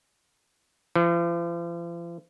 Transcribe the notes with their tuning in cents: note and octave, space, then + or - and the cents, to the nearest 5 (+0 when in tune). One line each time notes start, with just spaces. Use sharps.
F3 -45